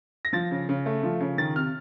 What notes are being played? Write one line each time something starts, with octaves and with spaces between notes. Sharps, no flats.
A#6
F3 A6
C#3
C#3
A3
F3
C#3
D#3 A6
C3 F6